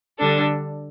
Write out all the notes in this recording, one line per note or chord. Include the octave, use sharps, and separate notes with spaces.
D3 G3 D4 A4